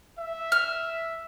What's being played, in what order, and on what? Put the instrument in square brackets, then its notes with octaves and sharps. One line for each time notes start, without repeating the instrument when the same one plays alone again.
[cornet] E5
[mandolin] F6